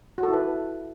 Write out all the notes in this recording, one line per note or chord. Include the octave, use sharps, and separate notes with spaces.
F#4
A4
E4
B4